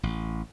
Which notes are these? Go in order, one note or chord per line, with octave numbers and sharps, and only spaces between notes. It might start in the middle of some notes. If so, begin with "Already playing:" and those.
A1